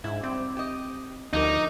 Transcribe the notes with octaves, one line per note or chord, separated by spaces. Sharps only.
G#2 E4
G3 C4
G4 D#5
D2 F3 D#4 G4 A#4